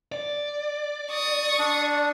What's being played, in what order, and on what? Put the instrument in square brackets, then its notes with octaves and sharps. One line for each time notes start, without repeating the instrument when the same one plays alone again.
[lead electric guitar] D5
[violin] C#6 D#6
[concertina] D4